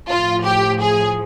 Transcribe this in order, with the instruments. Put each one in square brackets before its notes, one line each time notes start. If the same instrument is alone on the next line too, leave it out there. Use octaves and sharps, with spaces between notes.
[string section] A2 F3 F4
G4
G#4